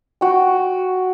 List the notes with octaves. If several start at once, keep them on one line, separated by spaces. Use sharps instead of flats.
F#4 G5